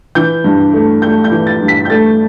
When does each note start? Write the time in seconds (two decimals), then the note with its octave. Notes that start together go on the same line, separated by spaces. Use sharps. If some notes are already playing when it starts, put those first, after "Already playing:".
0.15 E3 G6
0.44 G2
0.74 A3
1.02 A3 G6
1.24 G6
1.31 E3
1.47 A6
1.61 G2
1.68 B6
1.85 G6
1.90 A3 A6